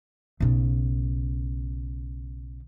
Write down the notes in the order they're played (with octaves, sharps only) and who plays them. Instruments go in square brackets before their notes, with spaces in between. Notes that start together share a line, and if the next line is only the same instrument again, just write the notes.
[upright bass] B1 C#3